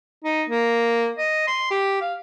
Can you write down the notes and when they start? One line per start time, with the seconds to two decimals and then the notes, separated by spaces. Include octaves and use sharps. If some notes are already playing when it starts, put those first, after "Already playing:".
0.25 D#4
0.50 A#3
1.18 D#5
1.48 C6
1.71 G4
2.01 F5